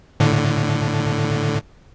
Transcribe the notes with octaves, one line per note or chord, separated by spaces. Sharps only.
A2 D3